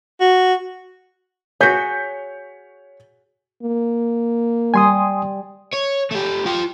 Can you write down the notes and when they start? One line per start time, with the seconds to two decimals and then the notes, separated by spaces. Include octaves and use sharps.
0.20 F#4
1.60 F#4 G#4 C#5 G6 B6
3.63 A#3
4.74 G3 G#5 C6 D#6
5.73 C#5
6.11 A3 G4
6.46 F4 G5